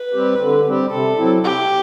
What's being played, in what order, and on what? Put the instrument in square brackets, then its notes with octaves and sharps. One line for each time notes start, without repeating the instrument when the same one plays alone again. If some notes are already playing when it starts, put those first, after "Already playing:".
Already playing: [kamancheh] B4
[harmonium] G3 C4 G4
D3
G3 C4 G4
[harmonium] C3 [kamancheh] A4
[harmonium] F#3 C4 E4
[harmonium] C3 [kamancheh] G4